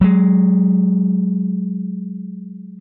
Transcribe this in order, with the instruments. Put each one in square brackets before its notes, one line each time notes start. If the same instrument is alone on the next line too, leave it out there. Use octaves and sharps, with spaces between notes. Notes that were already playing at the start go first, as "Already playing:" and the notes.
[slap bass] F#3 G#3